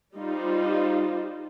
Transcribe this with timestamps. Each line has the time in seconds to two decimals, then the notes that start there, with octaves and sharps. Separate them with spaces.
0.17 G3 D#4 F4 C5